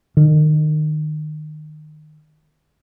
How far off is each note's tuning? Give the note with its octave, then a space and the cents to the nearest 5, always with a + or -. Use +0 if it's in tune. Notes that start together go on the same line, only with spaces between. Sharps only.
D#3 -25